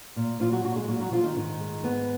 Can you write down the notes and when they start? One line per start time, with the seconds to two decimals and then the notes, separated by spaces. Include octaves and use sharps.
0.16 A#2
0.40 A#2 F3 F4
0.52 F#3 F#4
0.64 A#2 F#3 F#4
0.76 G#3 G#4
0.88 A#2 F#3 F#4
1.00 F#3 F#4
1.12 A#2 F3 F4
1.24 D#3 D#4
1.36 G#2 D#3 D#4
1.61 G#3
1.84 G#2 B3